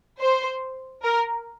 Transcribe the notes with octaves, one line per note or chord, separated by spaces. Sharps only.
C5
A#4